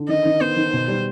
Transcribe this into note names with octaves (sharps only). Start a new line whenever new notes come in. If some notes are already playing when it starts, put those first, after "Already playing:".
Already playing: D3
D#3 D#5
D#3
B3 C5
D#3
B2
G3